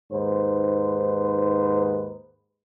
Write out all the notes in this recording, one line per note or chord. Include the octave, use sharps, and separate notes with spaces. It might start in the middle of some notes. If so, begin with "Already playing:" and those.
D#2 G#2 B4 C5